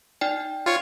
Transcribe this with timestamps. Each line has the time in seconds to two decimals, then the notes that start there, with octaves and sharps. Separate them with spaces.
0.21 D#4 D5 G5
0.66 F4 C#5